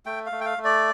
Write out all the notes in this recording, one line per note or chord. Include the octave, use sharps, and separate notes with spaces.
A3 G5
F5
A3
G5
F5
A3
D5